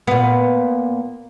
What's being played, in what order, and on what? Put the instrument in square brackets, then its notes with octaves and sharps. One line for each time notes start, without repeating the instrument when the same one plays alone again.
[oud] A#2 B3